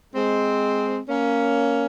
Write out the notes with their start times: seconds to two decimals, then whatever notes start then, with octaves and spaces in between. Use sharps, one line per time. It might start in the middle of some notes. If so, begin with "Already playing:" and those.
0.14 G#3 C4
1.09 A#3 C#4